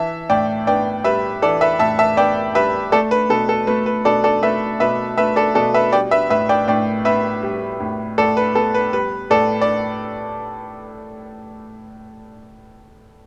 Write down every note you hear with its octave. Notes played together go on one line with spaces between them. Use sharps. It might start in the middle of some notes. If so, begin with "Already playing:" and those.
Already playing: E3 E5 A5
A2 D5 G5
B3 D5 G5
G3 B4 E5
E3 A4 D5
B4 E5
A2 E5 A5
E5 A5
B3 D5 G5
G3 B4 E5
A3 A4 D5
B4
B2 A4
A4
A3 B4
B4
B2 A4 D5
A4 D5
A3 B4 E5
B2 B4 E5
A3 B4 E5
A4 D5
B2 A4 D5
B4 E5
G3 D5 G5
B4 E5
A2 B4 E5
D5 G5
A2 D5 G5
B3 B4 E5
G3
A2
A2 A4 D5
B4
B3 A4
B4
G3 B4
A2 A4 D5
D5